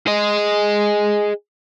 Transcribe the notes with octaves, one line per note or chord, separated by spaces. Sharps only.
G#4 D#5